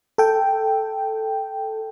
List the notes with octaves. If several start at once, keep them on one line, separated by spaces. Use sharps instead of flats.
A4 G5